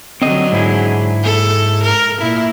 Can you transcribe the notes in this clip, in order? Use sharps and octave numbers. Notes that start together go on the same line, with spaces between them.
D3 F#3 C4 D#5
G#2 E4 G#4
A4
A#4
A#2 E4